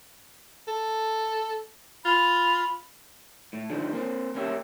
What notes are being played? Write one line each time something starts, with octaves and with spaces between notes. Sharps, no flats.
A4
F4 B5
A2
D3 F3 D#4
A#3 C4
A#3 C#4 E4 G4